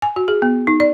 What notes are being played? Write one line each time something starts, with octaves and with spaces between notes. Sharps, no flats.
G#5
F#4
G#4
B3
D#4
D5